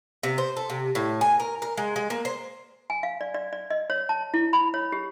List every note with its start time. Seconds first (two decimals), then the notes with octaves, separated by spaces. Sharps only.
0.23 C3
0.38 C5
0.57 A4
0.70 C3
0.95 A2
1.21 G#5
1.40 A#4
1.62 A#4
1.77 G#3
1.96 G#3
2.10 A#3
2.25 C5
2.90 G#5
3.03 F5
3.21 D5
3.34 D5
3.53 D5
3.70 D#5
3.90 C#5
4.09 A5
4.34 E4
4.53 B5
4.74 C#5
4.92 G4